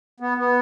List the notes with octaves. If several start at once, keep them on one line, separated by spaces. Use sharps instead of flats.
B3
B3